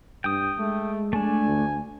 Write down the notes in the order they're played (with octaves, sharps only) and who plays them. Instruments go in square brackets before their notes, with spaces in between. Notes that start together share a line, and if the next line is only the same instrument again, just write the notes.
[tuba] G2 [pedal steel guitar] G5 D#6
[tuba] G#3 [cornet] A3
[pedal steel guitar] A3 D4 [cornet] G#5
[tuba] D2